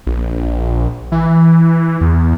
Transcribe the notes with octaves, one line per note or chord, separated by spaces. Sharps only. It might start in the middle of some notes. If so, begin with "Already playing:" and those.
A#1
E3
E2